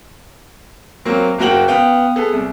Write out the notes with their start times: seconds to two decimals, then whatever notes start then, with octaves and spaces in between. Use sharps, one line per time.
1.05 F#3 A#3 C4
1.38 F#1 A#3 F#4 G5 F#7
1.68 B3 F5 G5
2.16 B3 G#4 A4
2.33 C2